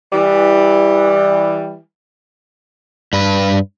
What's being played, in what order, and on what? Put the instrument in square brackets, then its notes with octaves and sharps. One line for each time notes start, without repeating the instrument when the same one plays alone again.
[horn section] E3 G3
[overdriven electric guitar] G2 B4